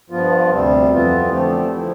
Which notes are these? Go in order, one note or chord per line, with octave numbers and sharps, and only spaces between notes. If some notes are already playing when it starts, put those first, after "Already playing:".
G2 F3 B3 F4
D2 C3 G3 C4
F2 E3 B3 F4
D3 F3 A3 C4 G4
D3 F3 C4 E4